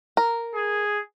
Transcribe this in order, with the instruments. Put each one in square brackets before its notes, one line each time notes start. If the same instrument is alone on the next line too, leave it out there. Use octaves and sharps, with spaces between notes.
[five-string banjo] A#4
[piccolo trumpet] G#4